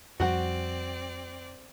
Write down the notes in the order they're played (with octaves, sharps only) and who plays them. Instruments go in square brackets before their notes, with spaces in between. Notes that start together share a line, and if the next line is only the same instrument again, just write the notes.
[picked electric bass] F2 F3 G3 [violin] C4 D5 [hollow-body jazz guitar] F#4 F#5